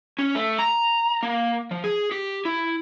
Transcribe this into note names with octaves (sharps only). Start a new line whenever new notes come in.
C#4
A3
A#5
A#3
F3
G#4
G4
E4